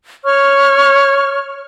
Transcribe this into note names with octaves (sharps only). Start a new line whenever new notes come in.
C#5 C#6 F6